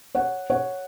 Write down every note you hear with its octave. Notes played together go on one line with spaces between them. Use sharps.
C#5 F#5
C#5 F#5